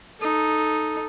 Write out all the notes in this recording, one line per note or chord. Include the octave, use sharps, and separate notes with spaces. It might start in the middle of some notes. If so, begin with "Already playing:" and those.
D#4 A4